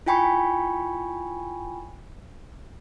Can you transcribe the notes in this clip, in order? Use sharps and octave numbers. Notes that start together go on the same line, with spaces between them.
E4 F4 G5 G#5 B5 C#6